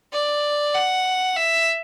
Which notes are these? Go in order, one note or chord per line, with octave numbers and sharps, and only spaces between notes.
D5
F#5
E5